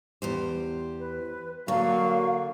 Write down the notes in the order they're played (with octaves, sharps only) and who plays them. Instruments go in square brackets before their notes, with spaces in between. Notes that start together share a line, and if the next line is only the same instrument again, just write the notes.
[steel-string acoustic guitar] E2 G4 C5
[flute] B4
[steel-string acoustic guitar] D3 [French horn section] F#3 A#3 [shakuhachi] F5 [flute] C#6